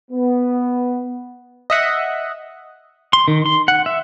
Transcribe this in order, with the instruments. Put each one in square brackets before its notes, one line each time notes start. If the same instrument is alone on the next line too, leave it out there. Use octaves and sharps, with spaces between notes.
[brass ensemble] B3
[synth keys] D#5 E5 F#5
[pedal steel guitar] C6
D#3
C6
F#5
E5